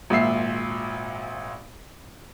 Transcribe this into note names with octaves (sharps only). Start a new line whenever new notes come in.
G#1 A#2 E5 C7